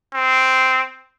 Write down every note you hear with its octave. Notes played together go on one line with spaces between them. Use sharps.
C4